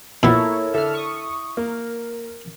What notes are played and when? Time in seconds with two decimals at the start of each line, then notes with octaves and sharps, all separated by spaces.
0.23 A#2 A#3 B3 E4 A4 A#4 C#5
0.74 D3 A4 E5 F6
0.94 C#6 D#6
1.57 A#3 A#4